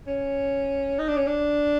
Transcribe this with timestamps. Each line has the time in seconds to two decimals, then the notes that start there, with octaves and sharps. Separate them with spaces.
0.07 C#4
0.99 D#4
1.08 D4
1.17 C#4
1.27 D4